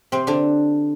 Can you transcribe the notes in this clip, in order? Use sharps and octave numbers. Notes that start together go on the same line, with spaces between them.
C3 C4
D3 D4